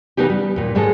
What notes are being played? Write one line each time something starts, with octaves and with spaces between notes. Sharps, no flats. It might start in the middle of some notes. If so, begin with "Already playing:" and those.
C#3 E3 B3 C#4 D#4 G4
G3
D#2 A#2
D#2 G#2 G#3 G#4 A4